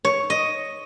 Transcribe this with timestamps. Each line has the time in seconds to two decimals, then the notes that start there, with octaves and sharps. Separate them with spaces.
0.05 C#5
0.30 D#5